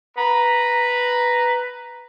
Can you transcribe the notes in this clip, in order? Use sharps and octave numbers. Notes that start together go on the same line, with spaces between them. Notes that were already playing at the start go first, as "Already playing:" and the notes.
B4 A#5